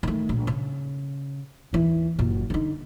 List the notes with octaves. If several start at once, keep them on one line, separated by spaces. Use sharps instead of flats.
D#3 A3
A#1
C#3
D#2 E3
F#1 A#2
D3 D#4